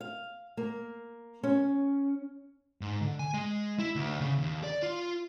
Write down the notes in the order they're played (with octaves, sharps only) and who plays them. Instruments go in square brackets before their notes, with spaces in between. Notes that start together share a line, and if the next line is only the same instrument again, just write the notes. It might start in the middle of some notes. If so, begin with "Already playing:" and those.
[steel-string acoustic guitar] F5
A#3
C#4
[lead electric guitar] G#2
D3
G#5
G#3
E4
D2
C#3
D#2
D5
F4